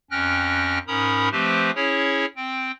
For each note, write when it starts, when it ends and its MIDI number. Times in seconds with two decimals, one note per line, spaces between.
0.11 0.79 41
0.11 0.79 61
0.11 0.79 79
0.11 0.79 89
0.11 0.79 90
0.11 0.79 94
0.87 1.29 44
0.87 1.29 61
0.87 1.29 70
0.87 1.29 82
0.87 1.29 83
0.87 1.29 87
1.32 1.71 53
1.32 1.71 57
1.32 1.71 60
1.32 1.71 67
1.32 1.71 71
1.32 1.71 72
1.75 2.25 61
1.75 2.25 64
1.75 2.25 68
1.75 2.25 73
2.36 2.72 60
2.36 2.72 79